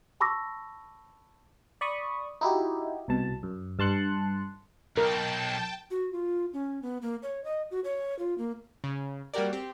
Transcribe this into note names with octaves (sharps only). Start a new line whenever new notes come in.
A5 B5 C#6 D6 E6 A#6
D5 B5 C#6 D#6
D#4 E4 F#4 G4
C2 B2 A5
F#2
G2 A5 C6 F#6 C#7
B1 A#4 G5 A5
F#4
F4
C#4
B3
A#3
C#5
D#5
F#4
C#5
F4
A#3
C#3
G3 A#3 F#4 G4 A#4 D5
C4 G4